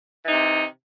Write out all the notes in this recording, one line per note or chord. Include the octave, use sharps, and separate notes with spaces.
C3 E3 D#4